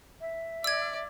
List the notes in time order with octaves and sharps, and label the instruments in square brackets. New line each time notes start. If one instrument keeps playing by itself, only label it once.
[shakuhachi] E5
[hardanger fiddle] D5 [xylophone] E6 G#6